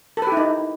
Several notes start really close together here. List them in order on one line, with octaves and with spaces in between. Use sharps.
A4 B4 G4 E4 D#4